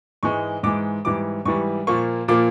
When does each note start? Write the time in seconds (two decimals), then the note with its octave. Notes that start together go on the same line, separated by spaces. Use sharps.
0.23 G#2 E3 G#3 C#6
0.63 G#2 E3 G#3 D6
1.05 G#2 E3 G3 D6
1.45 G#2 E3 G3 C#6
1.87 A#2 F3 A#3 C#6
2.28 A#2 F3 A#3 D6